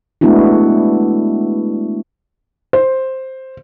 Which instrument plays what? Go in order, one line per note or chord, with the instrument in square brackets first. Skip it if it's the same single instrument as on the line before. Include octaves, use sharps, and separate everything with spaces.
[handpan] G#3 A3 B3 D4 E4 F#4
[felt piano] C5